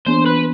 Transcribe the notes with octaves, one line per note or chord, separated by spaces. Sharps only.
E3 B3 D4 C5
B4